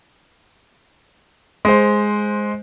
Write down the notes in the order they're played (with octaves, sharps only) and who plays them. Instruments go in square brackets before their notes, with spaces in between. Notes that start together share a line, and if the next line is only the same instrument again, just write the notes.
[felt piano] G#3 C5